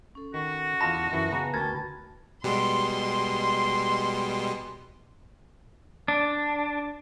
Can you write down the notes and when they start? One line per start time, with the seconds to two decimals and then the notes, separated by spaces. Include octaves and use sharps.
0.15 C#4 A4
0.34 D#3 F#4
0.81 E2 F4 D#5 A5 B5 A#6
1.12 F#2 E3 E5 F#5
1.32 C#3 B3 G#5 A#5
1.54 D2 F#4 A#4 B4 G5 A5 G#6
2.44 B2 G3 G#3 C6
6.08 D4